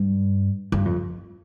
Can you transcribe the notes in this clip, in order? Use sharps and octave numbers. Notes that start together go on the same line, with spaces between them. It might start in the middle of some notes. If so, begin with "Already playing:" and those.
Already playing: G2
G2
F2